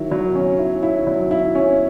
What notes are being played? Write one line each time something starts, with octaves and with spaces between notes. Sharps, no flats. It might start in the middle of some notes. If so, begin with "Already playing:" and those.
Already playing: D#3 F#3 E4
F#3
C#4
E4
E4
F#3
E4
C#4